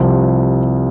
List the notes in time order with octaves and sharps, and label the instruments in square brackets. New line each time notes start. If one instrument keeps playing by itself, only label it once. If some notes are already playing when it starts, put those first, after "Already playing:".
Already playing: [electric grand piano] C2 C3 F3